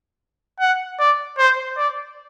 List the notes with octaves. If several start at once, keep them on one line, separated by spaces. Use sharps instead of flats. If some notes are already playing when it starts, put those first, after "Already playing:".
F#5
D5
C5
D5